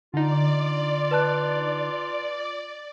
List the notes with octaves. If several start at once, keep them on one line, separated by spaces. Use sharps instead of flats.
D3 D#4 F4 D5
B4 A5 F#6